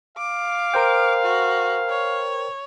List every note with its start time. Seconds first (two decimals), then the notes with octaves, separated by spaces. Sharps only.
0.17 F5 D6
0.74 A#4 C5 G5
1.23 F#4
1.88 C#5